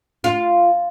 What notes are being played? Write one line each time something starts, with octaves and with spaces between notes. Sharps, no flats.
F4